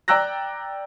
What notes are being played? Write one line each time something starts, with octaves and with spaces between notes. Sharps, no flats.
D5 G5 A#5 E6 F#6 A#6